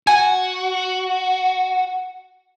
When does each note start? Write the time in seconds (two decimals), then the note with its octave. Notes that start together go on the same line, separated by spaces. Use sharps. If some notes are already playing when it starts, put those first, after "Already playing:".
0.07 F#4 G#5